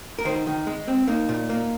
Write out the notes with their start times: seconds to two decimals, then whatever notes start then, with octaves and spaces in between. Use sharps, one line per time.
0.19 A#4
0.25 D#3 C5
0.47 D#3
0.67 G#3
0.88 C4
1.07 A#3 D#4
1.29 A#2
1.50 A#3